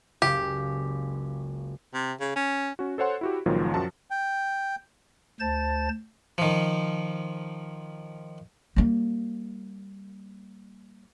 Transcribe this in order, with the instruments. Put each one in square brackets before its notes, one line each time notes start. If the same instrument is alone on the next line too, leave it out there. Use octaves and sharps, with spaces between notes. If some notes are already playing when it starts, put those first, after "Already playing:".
[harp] F#1 C#2 C#4 [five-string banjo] G4
[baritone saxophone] C3
C#3
C#4
[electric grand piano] C#4 F#4
A4 C5 C#5 F#5 C6
E4 F#4 G4
C#2 A#2 D#3 F3 F#3
F#2 F3 F#4 A5
[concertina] G5
[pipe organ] D2 C5 A5 A6
[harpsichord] D#3 F3
[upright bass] G3 A#3